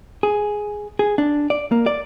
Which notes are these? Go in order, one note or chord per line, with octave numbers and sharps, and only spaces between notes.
G#4
G#4
D4
D5
A#3
D5